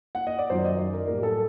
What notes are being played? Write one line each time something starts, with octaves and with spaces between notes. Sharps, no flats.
F#5
D#5
D5
F#2 D#3 F#3 C5
D#5
D5
A#4
A2 G3 A#3 A#4
G4
A4